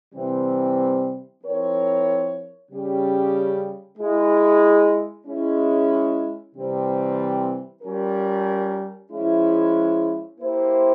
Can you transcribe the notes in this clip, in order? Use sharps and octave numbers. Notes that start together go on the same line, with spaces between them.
C3 E3 G3 C4
F3 C4 E4 A#4 C#5
C#3 G3 C#4 G4
G#3 E4 G#4
G#3 C#4 E4
C3 E3 G3 C4
G3 C#4 F4 A#4
F3 G#3 C#4 E4
A#3 E4 G4 C5